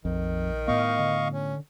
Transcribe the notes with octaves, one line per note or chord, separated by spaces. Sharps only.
A#1 F2 D#3
A2 B3 D#5 F5 C#6
D3
C#4